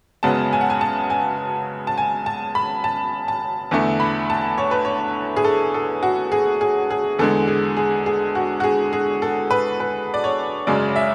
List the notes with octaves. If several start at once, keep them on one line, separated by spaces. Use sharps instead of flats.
F#2 C#3 G#3 B3 A5
G#5
F#5
G#5
A5
G#5
A5
G#5
A5
B5
A5
A5
E2 D3 A3
B5
A5
C#5
B4
C#5
G#4
A4
A4
F#4
G#4
G#4
G#4
E2 D3 G#3 A4
G#4
G#4
G#4
F#4
F#4
G#4
G#4
A4
B4
B4
D5
C#5
F#2 C#3 G#3 D5
E5